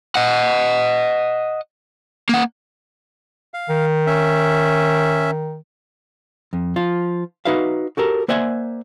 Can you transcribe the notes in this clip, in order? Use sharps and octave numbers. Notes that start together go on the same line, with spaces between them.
D#5 F#5
A#3 F#5
F5
D#3
C#4 E5
F2
F3 F4
D#4 F#4 B4 E5 F5
F#4 G4 A4 A#4
A#3 C5 D5 E5 F#5 G#5